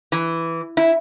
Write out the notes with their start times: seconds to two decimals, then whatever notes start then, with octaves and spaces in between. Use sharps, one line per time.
0.12 E3
0.77 E4